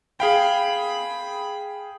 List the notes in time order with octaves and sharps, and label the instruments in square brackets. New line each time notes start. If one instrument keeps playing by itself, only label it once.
[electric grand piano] G#4 F5 G5 [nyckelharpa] B5